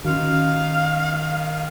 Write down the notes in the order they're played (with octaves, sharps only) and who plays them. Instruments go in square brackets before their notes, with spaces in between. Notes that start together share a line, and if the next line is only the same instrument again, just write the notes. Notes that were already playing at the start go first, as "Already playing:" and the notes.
[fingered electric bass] D#3 [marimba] C#4 F#4 [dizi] F5